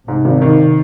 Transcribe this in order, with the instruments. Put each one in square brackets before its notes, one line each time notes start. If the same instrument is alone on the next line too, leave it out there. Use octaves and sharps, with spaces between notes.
[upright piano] G#2 [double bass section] C3
[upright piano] G#1
D#3